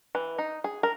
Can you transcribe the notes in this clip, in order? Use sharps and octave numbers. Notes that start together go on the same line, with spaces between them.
E3
D#4
G#4
A#4